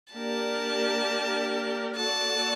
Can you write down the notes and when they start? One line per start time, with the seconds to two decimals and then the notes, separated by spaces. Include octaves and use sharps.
0.14 A#3 D4 G4 A#4 D5 A5
1.97 A#3 F#4 A4 D5 A5